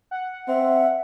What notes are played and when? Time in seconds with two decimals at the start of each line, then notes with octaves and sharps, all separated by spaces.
0.11 F#5
0.48 C4 E5